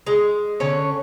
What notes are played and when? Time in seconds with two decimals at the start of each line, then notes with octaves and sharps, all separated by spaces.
0.06 G#3
0.60 D3 C#4 C#5